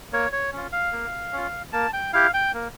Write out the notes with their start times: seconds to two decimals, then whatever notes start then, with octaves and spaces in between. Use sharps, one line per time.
0.12 A#3 C#5
0.33 C#5
0.53 C#4 F4
0.72 F5
0.92 A#3
1.33 C#4 F4
1.73 A#3 A5
1.93 G5
2.13 E4 G4 F5
2.34 G5
2.54 A#3